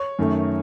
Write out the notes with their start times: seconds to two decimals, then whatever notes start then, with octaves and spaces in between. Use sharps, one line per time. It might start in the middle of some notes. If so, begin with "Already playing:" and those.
Already playing: C#5
0.19 F#2 D#3 A3